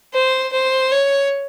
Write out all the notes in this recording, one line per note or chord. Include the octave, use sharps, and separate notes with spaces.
C5
C5
C#5